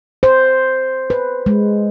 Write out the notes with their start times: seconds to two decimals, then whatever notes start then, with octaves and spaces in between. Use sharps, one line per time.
0.23 C5
1.10 B4
1.46 G#3